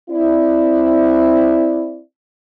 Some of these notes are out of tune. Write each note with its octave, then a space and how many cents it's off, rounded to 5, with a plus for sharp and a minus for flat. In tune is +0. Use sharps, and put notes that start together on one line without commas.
C4 +0 E4 +0 D5 +0